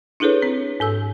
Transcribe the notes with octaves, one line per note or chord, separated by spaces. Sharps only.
D4 E4 G#4 A4 B4 C#5
C4
G#2 A4 E6